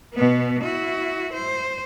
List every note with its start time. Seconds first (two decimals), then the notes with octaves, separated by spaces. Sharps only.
0.14 B2 B3
0.63 E4 F#4
1.33 C5